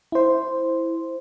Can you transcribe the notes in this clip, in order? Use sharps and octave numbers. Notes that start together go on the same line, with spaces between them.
E4 C5